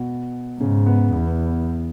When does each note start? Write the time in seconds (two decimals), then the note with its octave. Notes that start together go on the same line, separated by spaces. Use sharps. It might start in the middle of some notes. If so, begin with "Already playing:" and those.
Already playing: B2
0.60 G#2 C#3
0.86 B3
1.13 E2 B3